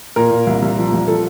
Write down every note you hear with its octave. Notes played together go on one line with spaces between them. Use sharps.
A#2 A#4
A#2
C2
C2
F3
C2
F3 A4